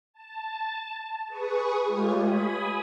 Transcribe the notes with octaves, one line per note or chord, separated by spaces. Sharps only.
A5
G#4 B4 C#6 D#6
G#3 A3 F4 G4 C#5
G#5 B5 D#6